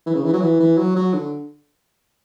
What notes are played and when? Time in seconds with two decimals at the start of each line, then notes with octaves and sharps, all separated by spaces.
0.06 E3
0.15 C#3
0.24 E3
0.33 F#3
0.41 E3
0.60 E3
0.77 F#3
0.96 F#3
1.14 D3